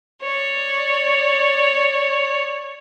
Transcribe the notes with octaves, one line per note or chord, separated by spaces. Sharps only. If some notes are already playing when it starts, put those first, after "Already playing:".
C#5 D5